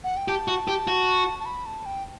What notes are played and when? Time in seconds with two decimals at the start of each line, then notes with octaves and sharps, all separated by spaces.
0.04 F#5
0.17 G5
0.28 G4 A5
0.48 F#4
0.68 G4
0.88 F#4
1.40 A5
1.46 B5
1.66 A5
1.86 G5